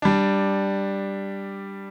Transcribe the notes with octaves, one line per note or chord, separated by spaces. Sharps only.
G3 D4